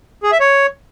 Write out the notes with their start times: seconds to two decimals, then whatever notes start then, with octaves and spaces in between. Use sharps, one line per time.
0.23 G#4
0.32 E5
0.40 C#5